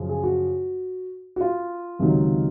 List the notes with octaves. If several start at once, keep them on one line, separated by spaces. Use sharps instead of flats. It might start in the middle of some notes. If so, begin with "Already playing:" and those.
Already playing: F#2 C#3 F3
G#4
F#4
F#4
F4
C#2 C3 D#3 F#3